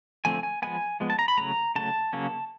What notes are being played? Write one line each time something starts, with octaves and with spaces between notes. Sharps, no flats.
D3 F3 A3 C4 G#5
G#5
F3 G#3 B3 G#5
F3 G#3 B3
A5
A#5
B5
C#3 F#3 A3 A#5
C#3 F#3 A3 A5
C#3 F#3 A#3 C#4